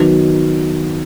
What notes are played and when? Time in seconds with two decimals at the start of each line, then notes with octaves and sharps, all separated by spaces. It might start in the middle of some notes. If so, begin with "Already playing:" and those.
Already playing: D#3 F#3 B3